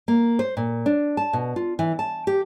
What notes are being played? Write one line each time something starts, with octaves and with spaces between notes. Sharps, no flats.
A#3
C5
A#2
D4
A5
B2
F4
E3
A5
G4